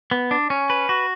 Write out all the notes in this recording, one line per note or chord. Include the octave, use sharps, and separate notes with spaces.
B3
D4
C#4
B4
F#4